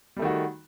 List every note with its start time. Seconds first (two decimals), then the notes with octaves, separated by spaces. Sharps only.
0.17 G3
0.19 A3
0.22 D#3
0.25 F#4